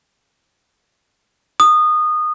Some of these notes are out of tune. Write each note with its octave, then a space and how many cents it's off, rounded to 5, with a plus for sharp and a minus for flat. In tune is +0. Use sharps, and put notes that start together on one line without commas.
D#6 -20